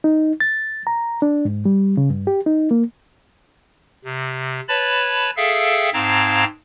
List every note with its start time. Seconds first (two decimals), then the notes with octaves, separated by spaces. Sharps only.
0.04 D#4
0.40 A6
0.87 A#5
1.22 D4
1.45 G#2
1.65 G3
1.97 C#3
2.10 G2
2.27 G4
2.46 D#4
2.71 A#3
4.04 C3
4.68 B4 C#5 A5 B5 A6
5.37 G#4 A4 E5 F5 G5
5.93 G#2 C4 F5 A5 A#5 G#6